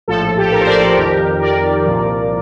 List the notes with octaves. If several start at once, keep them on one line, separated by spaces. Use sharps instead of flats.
A#1 A2 F3 A4
G4
A4
G4 A#4
C5
A#4 D5
A4
F2 D#3 G4 A#4
A#4 D5
C2 A#2 F3